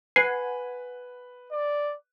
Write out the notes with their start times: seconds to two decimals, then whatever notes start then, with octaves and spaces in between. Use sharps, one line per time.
0.16 B4 F#5 G#5 C7
1.52 D5